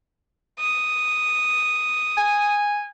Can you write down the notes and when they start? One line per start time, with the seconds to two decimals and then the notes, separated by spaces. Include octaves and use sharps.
0.60 D#6
2.17 G#5